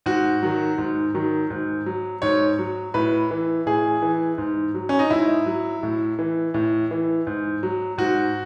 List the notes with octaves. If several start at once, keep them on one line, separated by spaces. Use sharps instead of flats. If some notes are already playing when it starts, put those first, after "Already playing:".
G#2 F#4
D#3 F#3
G#2
D#3 F#3
G#2
F#3
G#2 C#5
F#3
A2 B4
E3
A2 G#4
E3
G#2
F#3
C#4
D#4
G#2 E4
F#3
A2
E3
A2
E3
G#2
F#3
G#2 F#4